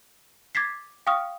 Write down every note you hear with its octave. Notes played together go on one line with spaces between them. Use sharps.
D6 G#6 A6 B6 C7
F5 G5 C#6 D#6 F6